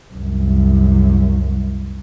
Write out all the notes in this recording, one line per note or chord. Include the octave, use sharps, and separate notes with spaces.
C2 F#2